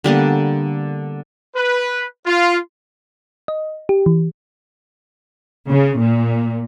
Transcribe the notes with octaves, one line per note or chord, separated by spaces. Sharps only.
D3 G3 A#3 B3
B4
F4
D#5
G4
E3
C#3
A#2